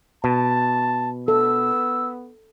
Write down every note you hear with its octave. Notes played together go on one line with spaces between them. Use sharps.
B2 A5
B3 A4 E6